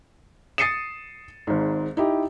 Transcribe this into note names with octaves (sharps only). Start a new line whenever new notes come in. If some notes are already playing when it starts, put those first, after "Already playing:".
D#6 A6 C7 C#7 D#7 E7
G#1 G#2
D#4 E4 G4